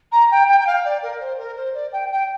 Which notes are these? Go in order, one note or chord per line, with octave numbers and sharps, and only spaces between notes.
A#5
G5
G5
G5
F5
D5
A#4
C5
A#4
C5
D5
G5
G5